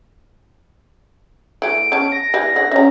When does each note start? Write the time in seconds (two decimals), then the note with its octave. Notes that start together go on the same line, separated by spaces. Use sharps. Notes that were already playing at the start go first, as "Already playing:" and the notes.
1.62 E3 A3 D7
1.92 C#4 A5
2.12 A#6
2.34 E3 G3 B4
2.56 D3 D5 A#6
2.72 C#4 E5 A#5